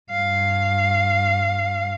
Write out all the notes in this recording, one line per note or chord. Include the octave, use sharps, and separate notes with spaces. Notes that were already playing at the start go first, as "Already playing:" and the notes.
G2 F5